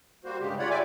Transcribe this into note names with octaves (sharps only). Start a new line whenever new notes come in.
G3 A#3 F#4 C5
G2 C#3 G#3 G4
F4 C#5 D5 F#5 B5
D5 E5 G5 G#5 D6